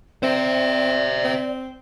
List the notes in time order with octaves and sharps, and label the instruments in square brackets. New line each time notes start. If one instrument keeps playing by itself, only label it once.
[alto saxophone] C4 [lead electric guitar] C5 E5 [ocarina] D5
[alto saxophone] C4